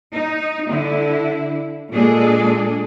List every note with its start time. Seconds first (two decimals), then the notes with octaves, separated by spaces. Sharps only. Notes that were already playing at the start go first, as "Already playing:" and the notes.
0.13 D#4
0.69 D3 E4
1.91 A#2 G#3 D4 G#4 A4